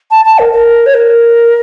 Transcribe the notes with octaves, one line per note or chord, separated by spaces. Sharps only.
A5
A5
A#4
A#4
C#5
A#4